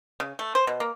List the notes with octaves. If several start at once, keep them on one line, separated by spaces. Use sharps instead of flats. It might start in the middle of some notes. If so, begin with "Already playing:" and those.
C#3
A3
C5
B2
A#3